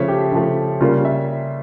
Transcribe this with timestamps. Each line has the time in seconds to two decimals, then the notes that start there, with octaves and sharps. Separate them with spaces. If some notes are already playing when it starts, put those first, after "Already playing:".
Already playing: C#3 F3 A3 C#5 E5
0.08 G4
0.32 C#3 F3 A3
0.80 C#3 G3 A#3 F4
1.05 E5